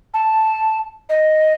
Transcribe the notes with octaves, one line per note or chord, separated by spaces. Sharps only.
A5
D#5